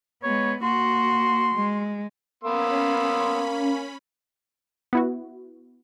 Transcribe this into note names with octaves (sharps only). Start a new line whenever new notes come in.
G#3 B3 C#5
A#3 F#4 C6
G#3
A#3 B3 C#4 B5 C6 E6
B3 E4 F#4